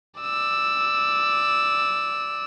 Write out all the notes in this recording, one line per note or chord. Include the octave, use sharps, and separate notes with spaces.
D5 E6